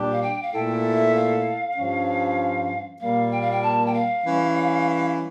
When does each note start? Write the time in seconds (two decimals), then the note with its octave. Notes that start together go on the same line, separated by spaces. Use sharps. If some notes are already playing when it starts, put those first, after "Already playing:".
Already playing: A#2 G3 D4 G4
0.12 F5
0.22 G5
0.42 F5
0.52 A#2 A3 E4 A4 G5
0.94 E5
1.15 F5
1.77 G2 F3 C#4
3.01 A#2 G3 A#3 F5
3.32 G5
3.41 F5
3.51 G5
3.62 A5
3.86 G5
3.94 F5
4.24 E3 G3 C#4